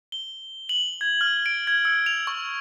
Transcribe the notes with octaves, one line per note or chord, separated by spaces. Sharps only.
G7
F#7
G#6
F6
D7
G#6
E6
F7
C#6